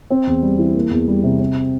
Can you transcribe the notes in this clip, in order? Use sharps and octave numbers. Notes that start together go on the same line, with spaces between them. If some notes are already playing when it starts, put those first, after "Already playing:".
C4
E2
G3
E3
A#3
E2
G3
C3
C4